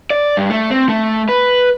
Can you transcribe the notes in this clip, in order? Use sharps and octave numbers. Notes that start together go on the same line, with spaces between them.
D5
G2
A3
C4
A3
B4